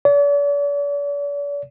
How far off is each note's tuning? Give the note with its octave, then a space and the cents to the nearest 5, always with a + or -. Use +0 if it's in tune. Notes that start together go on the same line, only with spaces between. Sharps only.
D5 -45